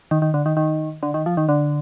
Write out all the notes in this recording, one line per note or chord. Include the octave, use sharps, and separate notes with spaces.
D#3
D#3
D3
D#3
D#3
D3
D#3
F3
D#3
D3